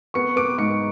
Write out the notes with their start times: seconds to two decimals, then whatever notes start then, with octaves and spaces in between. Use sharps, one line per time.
0.14 B3 C#6 C#7
0.36 B3 D6 D7
0.58 G#2 C#6 C#7